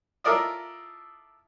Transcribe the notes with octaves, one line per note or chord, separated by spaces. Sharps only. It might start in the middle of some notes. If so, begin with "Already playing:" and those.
E4 F4 A4 A#4 D5 D#5